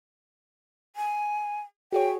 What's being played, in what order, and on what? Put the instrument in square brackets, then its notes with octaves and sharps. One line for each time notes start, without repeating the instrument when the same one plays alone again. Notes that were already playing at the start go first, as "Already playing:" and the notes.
[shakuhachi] G#5
[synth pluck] F#4 G#4 C#5 [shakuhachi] G5